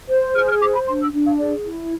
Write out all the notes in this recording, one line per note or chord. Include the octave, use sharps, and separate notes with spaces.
C5
G#4 F6
F6
C5 D6
B5
D4 C6
E6
D4
F5
G#4 D5
E4